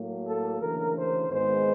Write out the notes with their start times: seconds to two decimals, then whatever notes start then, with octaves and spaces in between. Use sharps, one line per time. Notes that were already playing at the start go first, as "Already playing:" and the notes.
Already playing: A2 F#3 A#3
0.25 A4
0.60 D2 C#3 E3 A#4
0.94 C5
1.29 G#1 G#2 D#3 G#3 B3 C5